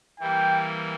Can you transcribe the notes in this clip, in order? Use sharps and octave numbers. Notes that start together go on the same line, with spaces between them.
E3 G3 A#3 G5